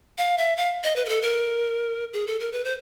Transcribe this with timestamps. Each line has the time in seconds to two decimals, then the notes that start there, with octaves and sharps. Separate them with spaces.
0.18 F5
0.38 E5
0.57 F5
0.84 D#5
0.96 B4
1.05 A#4
1.09 A4
1.22 A#4
2.13 G#4
2.27 A4
2.40 A#4
2.52 B4
2.65 C5